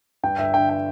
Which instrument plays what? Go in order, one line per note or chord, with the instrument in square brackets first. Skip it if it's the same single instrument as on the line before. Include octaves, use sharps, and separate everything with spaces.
[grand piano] G2 G5
G1 E5
D3 G5
G5